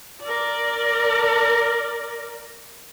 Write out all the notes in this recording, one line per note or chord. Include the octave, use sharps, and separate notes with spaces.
A#4 D5